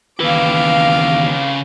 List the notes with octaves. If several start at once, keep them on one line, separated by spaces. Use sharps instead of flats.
D#2 C#3 E3 B4 F5 D6